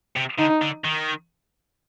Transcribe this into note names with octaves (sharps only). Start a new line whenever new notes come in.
C3
D3 D#4
D3
D#3